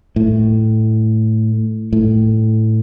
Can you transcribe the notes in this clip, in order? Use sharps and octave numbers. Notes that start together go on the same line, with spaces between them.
A2
A2